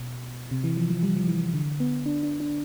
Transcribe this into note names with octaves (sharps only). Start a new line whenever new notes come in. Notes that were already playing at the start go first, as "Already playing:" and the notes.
Already playing: B2
C3
E3
F3
F3
G3
F3
E3
D3
B3
D4
D4
D4